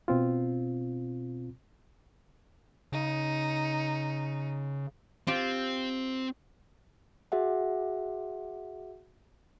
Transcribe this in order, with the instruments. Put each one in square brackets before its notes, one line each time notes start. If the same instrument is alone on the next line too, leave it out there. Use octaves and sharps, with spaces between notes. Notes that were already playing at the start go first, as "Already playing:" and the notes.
[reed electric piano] B2 C4 F4
[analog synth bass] C#3 [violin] D#4
[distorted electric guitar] C4 [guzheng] F4 G4
[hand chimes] F#4 G#4 E5 F#5